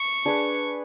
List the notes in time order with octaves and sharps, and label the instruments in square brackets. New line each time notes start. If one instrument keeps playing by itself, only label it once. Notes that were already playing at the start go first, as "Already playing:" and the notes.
Already playing: [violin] C#6
[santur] D4 G#4 B4